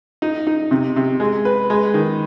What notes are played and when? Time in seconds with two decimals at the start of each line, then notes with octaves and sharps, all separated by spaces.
0.22 D#4
0.47 D#4
0.71 C3
0.96 C3
1.20 G#3
1.45 B4
1.70 G#3
1.94 D#3